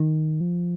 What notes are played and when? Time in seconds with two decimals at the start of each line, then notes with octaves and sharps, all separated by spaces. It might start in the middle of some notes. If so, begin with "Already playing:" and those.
Already playing: D#3
0.41 F3